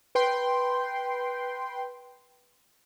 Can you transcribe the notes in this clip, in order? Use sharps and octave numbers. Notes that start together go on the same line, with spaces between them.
B4 G5 C6